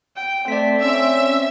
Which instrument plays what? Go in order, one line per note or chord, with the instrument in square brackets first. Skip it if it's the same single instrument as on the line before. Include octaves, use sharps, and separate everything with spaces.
[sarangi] G5
[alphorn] A3 [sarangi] C4 [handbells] D5 B6
[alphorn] C#4 [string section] E5